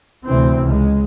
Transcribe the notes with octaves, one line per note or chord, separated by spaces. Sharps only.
D2 C3 E3 C4
C#2 G#3